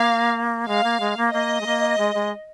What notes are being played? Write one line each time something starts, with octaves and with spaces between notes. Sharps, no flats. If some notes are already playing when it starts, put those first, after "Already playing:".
Already playing: A#3 F5
G#3 F5
A#3
G#3
A#3
A#3 D#5
G#3
A#3
G#3
G#3